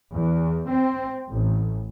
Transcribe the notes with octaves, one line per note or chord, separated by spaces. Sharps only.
E2
C4
A1